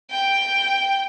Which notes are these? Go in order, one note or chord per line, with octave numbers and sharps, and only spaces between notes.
G5